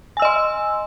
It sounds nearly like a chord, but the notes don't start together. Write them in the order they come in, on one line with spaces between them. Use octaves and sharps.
G#5 E6 D#5 C6